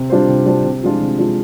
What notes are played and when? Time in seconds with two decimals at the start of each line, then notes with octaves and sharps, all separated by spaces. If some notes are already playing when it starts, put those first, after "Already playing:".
Already playing: C3
0.10 G3 D4 F4 C5
0.28 C3
0.46 G3 D4 F4 C5
0.64 C3
0.83 F3 G#3 D4 F4
1.01 C3
1.19 F3 G#3 D4 F4